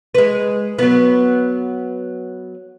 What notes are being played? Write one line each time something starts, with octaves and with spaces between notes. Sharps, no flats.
G#3 B4
F#3 B3